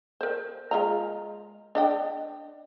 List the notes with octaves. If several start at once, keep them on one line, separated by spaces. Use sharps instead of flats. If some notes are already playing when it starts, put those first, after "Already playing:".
A#4 C5
G#3 F4 A#5
D4 D#5 G5